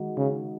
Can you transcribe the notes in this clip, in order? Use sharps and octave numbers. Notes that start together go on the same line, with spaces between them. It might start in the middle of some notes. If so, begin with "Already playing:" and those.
Already playing: D#3 G#3 D#4 F#4
C#3